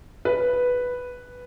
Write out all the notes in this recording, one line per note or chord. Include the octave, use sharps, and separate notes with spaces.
B4